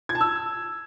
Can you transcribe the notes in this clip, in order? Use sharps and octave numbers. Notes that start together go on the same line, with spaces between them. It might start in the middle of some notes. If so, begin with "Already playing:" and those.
G#6
A5
E6